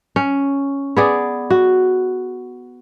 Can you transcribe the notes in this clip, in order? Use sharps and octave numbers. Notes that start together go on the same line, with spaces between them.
C#4
B3 G#4 D5
F#4